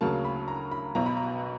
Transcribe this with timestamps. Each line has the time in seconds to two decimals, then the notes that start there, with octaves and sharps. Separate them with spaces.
0.01 D2 C#3 F#3 A#3 A5
0.24 B5
0.48 A#5
0.71 B5
0.95 B1 B2 F#3 A#5
1.06 B5
1.17 A#5